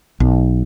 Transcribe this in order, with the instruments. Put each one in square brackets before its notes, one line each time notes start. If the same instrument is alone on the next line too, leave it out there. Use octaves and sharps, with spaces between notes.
[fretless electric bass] B1